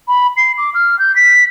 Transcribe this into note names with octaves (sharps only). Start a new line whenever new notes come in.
B5
C7
D6
F6
G6
B6